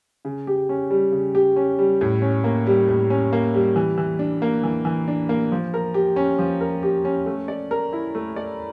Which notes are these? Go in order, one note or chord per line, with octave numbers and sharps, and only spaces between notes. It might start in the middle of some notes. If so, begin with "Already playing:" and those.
C#3
G4
C#4
G3
C#3
G4
C#4
G3
A2
C#4
A#3
G3
A2
C#4
A#3
G3
E3
E3
D4
A#3
E3
E3
D4
A#3
F3
A#4
G4
C#4
F3
A#4
G4
C#4
A3
D5
A#4
E4
A3
D5